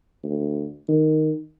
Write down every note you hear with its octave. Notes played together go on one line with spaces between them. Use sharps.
D2
D#3